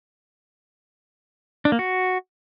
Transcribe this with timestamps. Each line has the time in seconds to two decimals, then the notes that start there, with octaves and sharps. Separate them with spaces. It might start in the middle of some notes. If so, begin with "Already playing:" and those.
1.65 D4
1.72 A#3
1.79 F#4